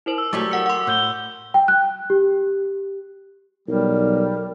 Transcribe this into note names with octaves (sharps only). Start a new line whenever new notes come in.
E4 A#4 C5
E6
F#3 G3 A3 D6 A6
A#4 F#5 E6 C#7
F#5 C6
A2 F#6 G6 G7
G5
F#6
G4
B1 G3 A#4